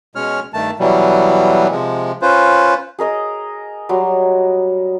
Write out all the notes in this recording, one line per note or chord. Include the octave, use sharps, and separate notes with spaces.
B2 G#3 C#4 C#5 F6
G2 D#3 A3 A5
B2 E3 F#3 G3
C3 F3 G#3
C#4 F4 B4 C5
G#4 A#4 D#5 D#6
F#3 G3 C6